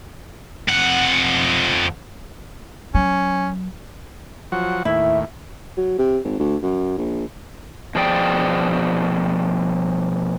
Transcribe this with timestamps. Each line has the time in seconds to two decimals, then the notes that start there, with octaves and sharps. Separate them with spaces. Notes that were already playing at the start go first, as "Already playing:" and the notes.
0.68 F2 F#5
2.95 F#3 C#4
4.52 F3 F#3 F#5
4.85 D#2 A2 E4
5.77 F#3
5.98 C3
6.24 G#1
6.40 D2
6.62 F#2
6.98 A#1
7.95 B2 F3 G#4 D5 G5